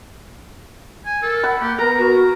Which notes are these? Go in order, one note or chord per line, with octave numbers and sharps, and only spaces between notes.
G#5
A4 A#4
F#5 B5
A#3 G4
B3 A#4 A#5
F#4